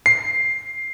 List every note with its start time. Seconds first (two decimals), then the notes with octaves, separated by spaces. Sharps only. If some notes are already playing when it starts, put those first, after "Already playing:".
0.06 C7